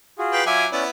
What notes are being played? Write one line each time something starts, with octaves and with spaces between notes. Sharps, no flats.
F4 F#4 G#4
B4 F5 G5
F#3 F4 E5 F#5 G#5 D6
B3 C#4 E4 D5